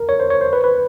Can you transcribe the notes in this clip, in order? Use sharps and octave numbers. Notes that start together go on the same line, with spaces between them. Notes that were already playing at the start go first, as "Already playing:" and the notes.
Already playing: A#4
C#5
C5
C#5
C5
B4
B4